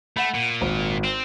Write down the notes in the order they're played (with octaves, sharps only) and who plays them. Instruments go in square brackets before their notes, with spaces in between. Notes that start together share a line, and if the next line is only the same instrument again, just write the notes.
[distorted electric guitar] A3 [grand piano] F#5 B5
[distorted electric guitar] A#2
[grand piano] G#1
[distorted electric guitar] C4